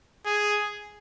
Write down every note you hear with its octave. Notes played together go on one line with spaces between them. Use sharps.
G#4